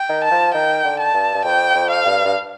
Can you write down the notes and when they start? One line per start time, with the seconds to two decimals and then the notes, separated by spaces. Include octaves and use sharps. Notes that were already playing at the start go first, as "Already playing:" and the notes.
Already playing: G5
0.09 D#3
0.24 A5
0.31 F3
0.54 D#3 G5
0.84 D3
0.99 A5
1.14 G2
1.34 G2
1.45 F2 G5
1.75 F2
1.90 F5
2.06 G2
2.25 G2